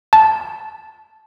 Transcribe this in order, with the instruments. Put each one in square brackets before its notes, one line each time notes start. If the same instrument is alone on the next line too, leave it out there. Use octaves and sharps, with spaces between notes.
[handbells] A5